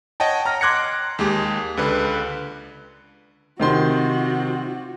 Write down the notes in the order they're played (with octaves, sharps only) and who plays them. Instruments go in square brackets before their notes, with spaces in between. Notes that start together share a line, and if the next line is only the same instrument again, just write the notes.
[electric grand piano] C#5 D#5 F#5 G5 A5
A#5 F6 A#6
C6 D6 F#6 G#6 A#6 C#7
D#2 G#3 G4
C#2 D3 B4
[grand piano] C3 D#3 C6 [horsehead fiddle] F4 F#4